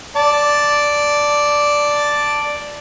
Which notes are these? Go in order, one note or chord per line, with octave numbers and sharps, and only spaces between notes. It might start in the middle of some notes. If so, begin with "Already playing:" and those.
D5 A5